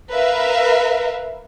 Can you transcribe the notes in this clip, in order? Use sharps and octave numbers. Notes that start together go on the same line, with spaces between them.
A#4 B4 E5 F5